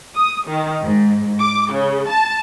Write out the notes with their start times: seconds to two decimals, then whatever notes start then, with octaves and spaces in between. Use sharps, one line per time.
0.16 D#6
0.48 D#3
0.84 G#2
1.40 D6
1.72 C#3
2.11 A5